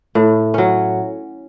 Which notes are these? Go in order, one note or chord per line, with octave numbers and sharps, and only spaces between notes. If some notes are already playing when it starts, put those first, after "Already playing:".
A2
F#3 C#4